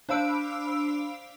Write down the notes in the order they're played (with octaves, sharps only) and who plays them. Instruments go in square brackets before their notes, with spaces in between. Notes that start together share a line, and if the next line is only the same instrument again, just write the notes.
[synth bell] D4 C5 F5 B5 E6 D7